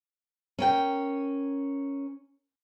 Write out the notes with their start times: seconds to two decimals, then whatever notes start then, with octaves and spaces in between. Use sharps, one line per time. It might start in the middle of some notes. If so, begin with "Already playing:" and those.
0.59 C#4 A#4 G5